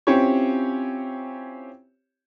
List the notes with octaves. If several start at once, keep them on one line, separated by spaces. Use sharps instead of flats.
C4 C#4 E4 F4 G4 C#5